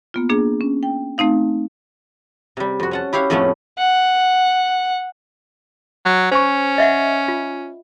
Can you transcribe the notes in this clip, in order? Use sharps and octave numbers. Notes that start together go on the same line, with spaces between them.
A#3 B3 F4
A#3 D4 G#4
C#4
G5
A3 C4 D#4 F5
C3 G3
F2 F#4
C#4 F#5 A5
E4 G4 C#5 F5 F#5
F2 A2 F3 A3 B3 C#4
F#5
F#3
C#4 C5 G#5 C#6
D#5 E5 F#5
F4